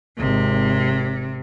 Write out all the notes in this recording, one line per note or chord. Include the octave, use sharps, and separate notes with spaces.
G#1 C3